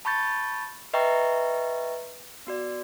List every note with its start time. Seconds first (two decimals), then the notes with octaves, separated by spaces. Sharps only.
0.05 A5 B5 C#6 G6 A6
0.94 B4 D#5 E5 G5 A#5 C#6
2.47 B3 F#4 D5